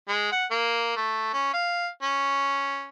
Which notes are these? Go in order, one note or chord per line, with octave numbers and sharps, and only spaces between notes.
G#3
F#5
A#3
A3
C#4
F5
C#4